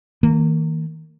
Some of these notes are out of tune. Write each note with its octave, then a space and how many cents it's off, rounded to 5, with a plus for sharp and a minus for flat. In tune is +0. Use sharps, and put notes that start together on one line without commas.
D#3 +40 A#3 -25